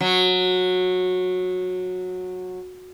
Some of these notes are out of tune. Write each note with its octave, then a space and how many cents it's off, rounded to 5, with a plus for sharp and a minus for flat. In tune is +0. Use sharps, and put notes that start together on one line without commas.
F#3 -15